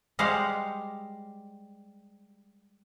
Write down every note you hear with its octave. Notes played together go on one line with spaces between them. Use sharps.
G3 G#3 G4 C5 F5 F#5